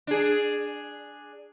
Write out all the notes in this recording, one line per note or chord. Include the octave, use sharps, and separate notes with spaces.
D4 G#4